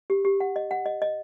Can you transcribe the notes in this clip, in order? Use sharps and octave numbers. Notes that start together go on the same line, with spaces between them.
G4
G4
F#5
D#5
F#5
D#5
D#5